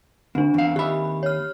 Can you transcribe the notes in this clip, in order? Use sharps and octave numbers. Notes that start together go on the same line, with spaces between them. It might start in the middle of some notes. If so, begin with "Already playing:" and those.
D2 C4 D4
E2 F5
D#2 G4 E5 B5
C#5 F6